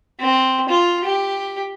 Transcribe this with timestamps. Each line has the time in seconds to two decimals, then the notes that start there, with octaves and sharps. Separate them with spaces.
0.20 C4
0.69 F4
1.05 G4